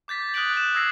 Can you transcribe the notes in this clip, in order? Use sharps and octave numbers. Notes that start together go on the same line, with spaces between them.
D6 G6 A6 B6
D#6 F#6 G6 B6 D7 F#7
F#6 E7
D#6 E6 G#6 A#6 C7